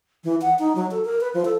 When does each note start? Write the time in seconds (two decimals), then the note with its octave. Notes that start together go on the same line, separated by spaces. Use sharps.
0.24 E3
0.42 F#5
0.59 D#4
0.76 F#3
0.91 A4
1.05 A#4
1.21 B4
1.34 F3
1.45 A4